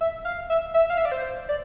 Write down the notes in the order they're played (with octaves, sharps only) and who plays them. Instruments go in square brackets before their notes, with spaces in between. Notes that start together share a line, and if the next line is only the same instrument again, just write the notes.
[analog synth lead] E5
F5
E5
E5
F5
E5
D5
C5
D5